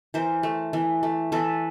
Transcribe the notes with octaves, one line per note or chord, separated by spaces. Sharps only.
E3 A#4 C5
A3
E3
A3
E3 A4 B4